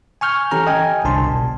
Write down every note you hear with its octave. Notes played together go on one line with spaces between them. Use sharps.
G#5 C#6 F6 G6
E3 C#4 G4 A4 A#5 F6
D#5 G5 G#5
G1 C2 D4 A5 C6
B2